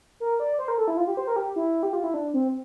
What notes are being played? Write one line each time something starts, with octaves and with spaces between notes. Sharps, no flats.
A#4
D5
C5
A#4
A4
E4
F4
G4
C5
A#4
G4
E4
G4
F4
E4
D4
C4